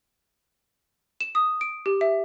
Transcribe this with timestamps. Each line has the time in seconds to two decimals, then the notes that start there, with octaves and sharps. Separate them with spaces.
1.21 E7
1.35 D#6
1.61 D7
1.86 G4
2.01 E5